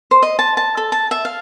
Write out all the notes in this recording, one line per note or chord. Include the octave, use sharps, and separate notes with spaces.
C5
D#5
A5
A5
A4
A5
E5
F5